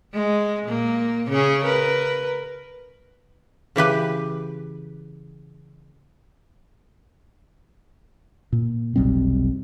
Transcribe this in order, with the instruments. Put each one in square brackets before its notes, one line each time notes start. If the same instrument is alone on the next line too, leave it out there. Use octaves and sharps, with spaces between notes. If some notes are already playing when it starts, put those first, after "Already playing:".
[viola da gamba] G#3
A#2 A#3
C#3 C#4 G#4
A#4 B4
[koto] C#3 E3 G4 B4
[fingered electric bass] A#2
F1 B1 G3 C4